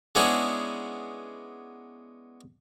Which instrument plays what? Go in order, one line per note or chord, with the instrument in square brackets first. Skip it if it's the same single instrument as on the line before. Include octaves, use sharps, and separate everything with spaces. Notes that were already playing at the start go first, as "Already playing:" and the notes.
[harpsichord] G#3 B3 C#4 D4 E4 G#4